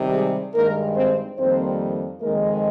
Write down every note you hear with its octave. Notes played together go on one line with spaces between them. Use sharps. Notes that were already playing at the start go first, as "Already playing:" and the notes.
Already playing: C3 D#3 G3
G#3 G#4
G2 D#3 G#3 A#3 A#4
C4 C5
F2 D#3 G3 A#3 C4 C5
F2 D#3 G#3 A#3 A#4